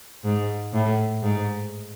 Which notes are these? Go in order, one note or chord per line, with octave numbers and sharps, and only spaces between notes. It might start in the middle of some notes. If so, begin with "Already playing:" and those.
G#2
A2
G#2